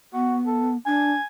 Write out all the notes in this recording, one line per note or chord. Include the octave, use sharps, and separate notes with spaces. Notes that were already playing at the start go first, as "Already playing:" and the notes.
B3 F#4
A4
D4 G#5